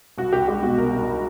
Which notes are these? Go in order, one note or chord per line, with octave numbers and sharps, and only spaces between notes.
C2 F#4
C2 G4
G#3 G4
B2 F#4
C2 A#4
C2
A#4